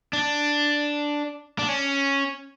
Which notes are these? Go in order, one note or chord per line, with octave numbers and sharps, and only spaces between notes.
D4
D4
C#4